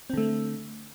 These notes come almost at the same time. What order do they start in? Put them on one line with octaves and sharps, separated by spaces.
C4 D3 A3